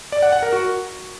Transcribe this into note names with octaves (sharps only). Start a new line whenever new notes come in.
D5
F#5
F#5
A#4
F#4